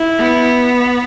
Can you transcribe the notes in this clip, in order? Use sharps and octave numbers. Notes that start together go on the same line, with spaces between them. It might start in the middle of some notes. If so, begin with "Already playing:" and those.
Already playing: E4
B3